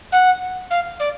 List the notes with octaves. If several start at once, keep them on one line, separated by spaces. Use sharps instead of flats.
F#5
F5
D5